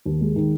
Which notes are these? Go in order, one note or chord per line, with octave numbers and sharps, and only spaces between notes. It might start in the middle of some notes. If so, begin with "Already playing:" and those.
D#2
G#3
D#3